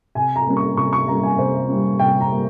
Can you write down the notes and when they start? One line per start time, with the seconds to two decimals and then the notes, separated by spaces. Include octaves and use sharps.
0.15 C3 G#5
0.36 A#5
0.46 G3 A#3 C#4
0.57 C#6
0.77 C3 C#6
0.93 C#6
1.07 G3 A#3 C#4 A#5
1.23 G#5
1.38 C3 C5
1.68 G3 A#3 C#4
1.99 C3 G5
2.21 A#5
2.31 G3 A#3